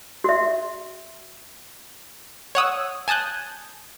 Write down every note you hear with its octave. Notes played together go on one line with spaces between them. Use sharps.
F#4 E5
C#5 F#5 D#6 E6
G#5 A5 D#6 F#6 G6